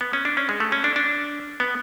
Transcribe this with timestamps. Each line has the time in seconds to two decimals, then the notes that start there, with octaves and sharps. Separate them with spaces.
0.01 B3
0.13 C#4
0.25 D4
0.37 C#4
0.49 G#3
0.60 A3
0.72 C#4
0.84 D4
0.96 D4
1.60 B3